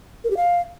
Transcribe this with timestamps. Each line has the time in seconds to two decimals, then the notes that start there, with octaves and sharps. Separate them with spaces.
0.24 A#4
0.30 G4
0.37 F5